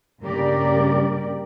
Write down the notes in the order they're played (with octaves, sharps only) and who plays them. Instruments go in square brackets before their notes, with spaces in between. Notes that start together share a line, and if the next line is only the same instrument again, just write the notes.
[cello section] G2 C#3 A#3 G4 A#4 D5